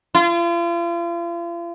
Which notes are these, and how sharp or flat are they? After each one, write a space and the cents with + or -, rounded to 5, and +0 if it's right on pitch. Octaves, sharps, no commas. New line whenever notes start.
F4 -40